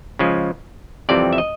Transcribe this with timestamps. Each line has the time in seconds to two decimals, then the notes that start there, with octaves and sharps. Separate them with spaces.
0.19 C#3 F3 G#3
1.09 F2 C3 E3 G3 C4 D5
1.33 E5
1.38 D#5